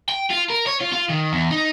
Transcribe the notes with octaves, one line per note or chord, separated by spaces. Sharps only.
G5
F4
A#4
C#5
F4
F4
D#3
E2
D#4